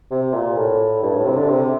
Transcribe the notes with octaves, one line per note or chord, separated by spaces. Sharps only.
C3
A#2
A2
G2
A2
C3
D3
C3